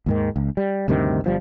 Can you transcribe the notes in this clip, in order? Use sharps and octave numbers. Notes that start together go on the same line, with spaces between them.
D#2 G#2 D#3
C#2
G3
D2 G2 C3 D#3
G1 F3 G3